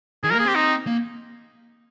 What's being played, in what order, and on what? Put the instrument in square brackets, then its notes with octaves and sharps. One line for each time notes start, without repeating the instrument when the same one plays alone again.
[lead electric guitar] D#3 [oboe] G#4
[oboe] A#4
[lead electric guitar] A#3
[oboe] G#4
[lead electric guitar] C4 [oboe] G4
[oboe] D#4
[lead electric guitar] A#3